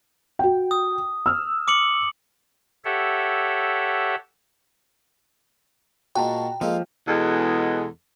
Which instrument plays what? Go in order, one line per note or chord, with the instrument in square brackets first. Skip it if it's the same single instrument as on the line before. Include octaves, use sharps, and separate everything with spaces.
[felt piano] F#4 G5
[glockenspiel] D#6
[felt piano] E6 F6
[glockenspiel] D6 C#7 F#7
[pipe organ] G4 A4 C#5 E5 F#5
[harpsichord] A#2 G#3 [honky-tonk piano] F#4 A5 A#5 [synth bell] G5
[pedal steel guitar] F3 [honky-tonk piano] G#3 A#3 [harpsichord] D#4 F4 A4
[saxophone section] E2 B2 G#3 A4 F#5